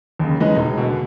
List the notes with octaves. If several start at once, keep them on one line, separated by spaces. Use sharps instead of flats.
D#2 C#3
E3 G#3 C#4 D#4 B4
E1
B2 D3